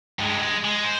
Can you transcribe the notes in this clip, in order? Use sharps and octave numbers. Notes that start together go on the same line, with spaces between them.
G2 G#3
G#3
G#3
C5